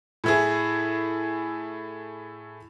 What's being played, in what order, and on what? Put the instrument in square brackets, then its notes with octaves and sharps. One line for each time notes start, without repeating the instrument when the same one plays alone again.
[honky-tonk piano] A2 E4 G#4